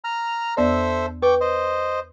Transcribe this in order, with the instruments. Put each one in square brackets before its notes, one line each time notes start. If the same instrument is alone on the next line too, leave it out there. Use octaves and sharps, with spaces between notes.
[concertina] A#5 F6
[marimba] E2 B3 D5 [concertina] A4 C5 E5
[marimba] B4 [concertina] G5 C#6 D6
[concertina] C5 D#5